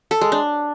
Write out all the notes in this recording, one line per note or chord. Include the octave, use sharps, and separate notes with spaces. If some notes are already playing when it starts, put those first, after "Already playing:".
A4
G#3
D4